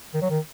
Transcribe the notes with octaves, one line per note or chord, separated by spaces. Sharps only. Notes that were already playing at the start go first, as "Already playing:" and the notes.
D#3
F#3
D#3